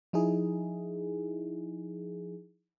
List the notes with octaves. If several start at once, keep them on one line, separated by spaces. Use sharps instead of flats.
F3 D#4 E4 G#4